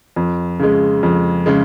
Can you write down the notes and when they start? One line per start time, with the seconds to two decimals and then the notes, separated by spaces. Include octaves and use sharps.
0.16 F2
0.59 C#3 G#3
1.03 F2
1.46 C#3 G#3